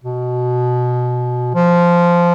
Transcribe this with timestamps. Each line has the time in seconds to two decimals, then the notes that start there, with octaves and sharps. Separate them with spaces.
0.04 B2
1.55 F3